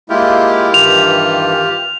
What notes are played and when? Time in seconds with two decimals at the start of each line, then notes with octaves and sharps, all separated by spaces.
0.10 G#3 A#3 E4 F4 G4
0.74 G2 D#3 E3 F7